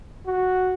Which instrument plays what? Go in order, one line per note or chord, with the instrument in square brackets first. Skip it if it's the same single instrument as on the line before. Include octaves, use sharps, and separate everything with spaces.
[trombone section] F#4